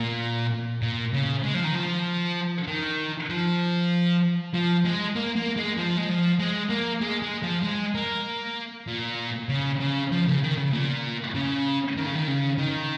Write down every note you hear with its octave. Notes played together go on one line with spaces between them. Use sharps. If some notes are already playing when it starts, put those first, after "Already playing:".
Already playing: A#2
A#2
C#3
G#3
F3
D#3
F3
D#3
F3
F3
G#3
A#3
A#3
G#3
F3
G#3
F3
G#3
A#3
G#3
G#3
F3
G#3
A#3
A#2
C#3
C#3
F3
C#3
D#3
C#3
A#2
C#3
D#3
C#3
D#3
C#3
D#3